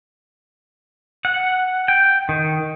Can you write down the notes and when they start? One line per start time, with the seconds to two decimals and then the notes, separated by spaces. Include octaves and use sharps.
1.25 F#5
1.88 G5
2.29 D#3